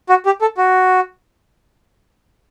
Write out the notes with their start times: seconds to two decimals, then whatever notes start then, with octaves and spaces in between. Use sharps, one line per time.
0.09 F#4
0.26 G4
0.41 A4
0.57 F#4